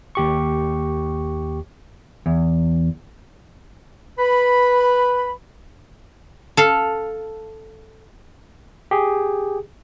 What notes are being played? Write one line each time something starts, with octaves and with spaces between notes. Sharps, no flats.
D#2 G4 C#6
E2
B4 B5
A4 F5
G4 G#4